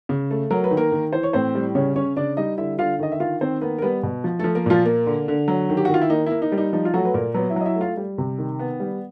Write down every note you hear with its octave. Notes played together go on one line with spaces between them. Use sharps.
C#3
A3
F#3 A#4
B4
D#3
A#3 A#4
D#3
E3 C5
C#5
A2 C4 C5
G3
C#3 C#4 C#5
C#3 C#4 C#5
C#3 D4 D5
G3 D#4 D#5
D3 E4 E5
D3 F4 F5
D#3 D#5
E5
D#3 F4 F5
D#3 C4 C5
A#3 B3 B4
A#4
G3 B3 B4
B2
F3
F3 A3 A4
A#3 A#4
A#2 F3 F4
A#3
D3
D3
F#3
D#3
G4
F#4
D#3 F4
E4
A#3 D#4
A#3 E4
D#4
G3
D#4
F3 D#4
F4
F#3 A3 F#4
B4
A#2 A#3 A#4
F#3 B3 B4
E4 E5
F#3 D#5
E4 E5
A3
F4 F5
G3
C3
D#3
B3
G3